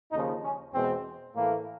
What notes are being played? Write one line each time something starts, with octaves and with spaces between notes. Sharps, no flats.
D#2 C#3 F3 D#4
C#4
E2 B2 G#3 C4
A2 E3 A3 A#3